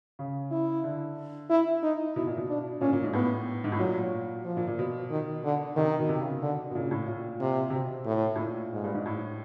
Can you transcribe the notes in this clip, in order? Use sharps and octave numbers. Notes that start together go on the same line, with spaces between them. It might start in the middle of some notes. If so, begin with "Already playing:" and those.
C#3
E4
D3
E4
D#4
B2 E4
A#2
B2
D4
A#2 C#4
A#2
G#2
A2 B3
G#2
A2
A#2 F#3
F3
A#2
A#2
B2
D#3
D3
C3 D#3
B2
C3
C#3
B2
D3
B2
A#2 C#3
A2
A#2
C3
C3
B2
A2
A2
A#2
G#2
G2
G#2
A2